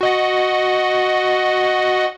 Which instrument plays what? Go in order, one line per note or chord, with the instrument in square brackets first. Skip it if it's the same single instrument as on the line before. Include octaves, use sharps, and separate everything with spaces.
[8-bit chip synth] F#4 D#5 F#5